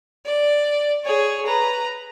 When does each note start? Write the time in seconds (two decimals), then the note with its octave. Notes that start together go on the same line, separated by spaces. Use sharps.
0.25 D5
1.04 G#4 C#5
1.46 B4 A#5